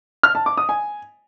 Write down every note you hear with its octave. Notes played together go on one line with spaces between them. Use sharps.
F6
A5
D6
D#6
G#5